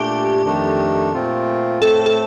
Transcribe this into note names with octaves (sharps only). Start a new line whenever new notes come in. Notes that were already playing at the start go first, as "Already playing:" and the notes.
Already playing: A#2 A3 D4 G4
F2 D#3 A3 D4
A#2 A3 C4 F4
A2 A3 C4 A4
A4